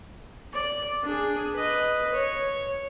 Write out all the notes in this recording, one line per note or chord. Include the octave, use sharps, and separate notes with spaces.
D5
D4 G#4
B4 D#5
C#5